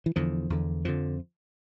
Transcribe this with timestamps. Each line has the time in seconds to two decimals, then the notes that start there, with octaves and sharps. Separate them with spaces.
0.06 E3
0.16 E2 D3 F3
0.50 E2 D3
0.85 F2 D3 F3